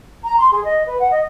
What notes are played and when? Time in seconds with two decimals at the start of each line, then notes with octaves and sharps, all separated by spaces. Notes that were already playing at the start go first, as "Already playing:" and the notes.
0.24 A#5
0.38 C6
0.52 G#4
0.64 D#5
0.86 B4
0.99 F#5
1.11 D#5